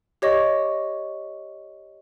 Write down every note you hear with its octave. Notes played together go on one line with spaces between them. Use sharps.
G4 C#5 D#5 C#6